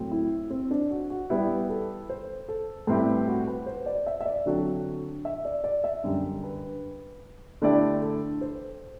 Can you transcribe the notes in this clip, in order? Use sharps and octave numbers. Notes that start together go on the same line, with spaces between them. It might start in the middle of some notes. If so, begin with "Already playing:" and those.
Already playing: A2 F#3 C4
E4
C4
D4
F#4
F#4
G3 B3 E4 G4
A4
C5
A4
A2 G3 C4 E4 G4 B4
F#4
B4
C5
D5
E5
E5
D5
D3 F#3 C4 F#4 A4
E5
D5
D5
E5
F#2 D3 G3
B4
D3 A3 E4 G4 A4 D5
A4
C5